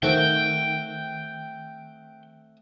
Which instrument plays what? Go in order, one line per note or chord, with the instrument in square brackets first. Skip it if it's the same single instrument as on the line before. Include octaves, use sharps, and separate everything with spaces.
[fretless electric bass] D#3 [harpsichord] A3 C4 F#4 [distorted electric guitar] G5